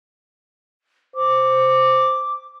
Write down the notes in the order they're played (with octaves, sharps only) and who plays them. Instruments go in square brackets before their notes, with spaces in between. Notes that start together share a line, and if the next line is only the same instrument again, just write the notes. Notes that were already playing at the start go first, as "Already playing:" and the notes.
[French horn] C5 [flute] D6